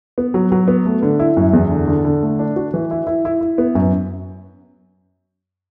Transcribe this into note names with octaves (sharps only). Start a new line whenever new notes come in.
B3
F#3
F#3
B3
A3
D3
E4
F#2
E2
D3
D3
D3
A3
D4
F#4
E3
E4
E4
E4
E4
B3
F#2